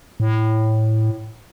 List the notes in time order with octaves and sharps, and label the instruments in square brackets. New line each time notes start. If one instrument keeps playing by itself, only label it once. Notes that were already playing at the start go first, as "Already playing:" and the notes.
[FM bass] A2